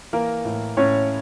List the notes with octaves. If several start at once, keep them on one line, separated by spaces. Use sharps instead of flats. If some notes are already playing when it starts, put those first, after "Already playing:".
E3 A#3 A#4
A2
A2 C#4 C#5